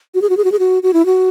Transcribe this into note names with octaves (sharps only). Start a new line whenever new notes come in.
F#4
G#4
F#4
G#4
F#4
G#4
F#4
F#4
E4
F#4